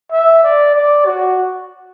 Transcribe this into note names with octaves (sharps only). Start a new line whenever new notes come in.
E5
D5
D5
F#4